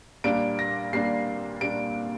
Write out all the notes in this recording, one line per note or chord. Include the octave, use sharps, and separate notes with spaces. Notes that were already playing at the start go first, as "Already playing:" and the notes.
A#2 G3 A#3 D4 D7
A#6
A#2 G3 A#3 D4 C7
A#2 G3 A#3 D4 D7